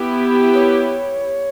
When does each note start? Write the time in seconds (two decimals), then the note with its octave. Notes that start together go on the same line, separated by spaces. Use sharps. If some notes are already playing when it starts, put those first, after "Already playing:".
Already playing: B3 E4 G4
0.54 C#5